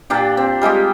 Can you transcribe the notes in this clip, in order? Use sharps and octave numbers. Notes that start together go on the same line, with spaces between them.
A#2 D4 G4
C4
G3 G#3 F4 G4